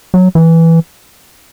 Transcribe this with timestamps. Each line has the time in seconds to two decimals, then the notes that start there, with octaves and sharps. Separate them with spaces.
0.14 F#3
0.35 E3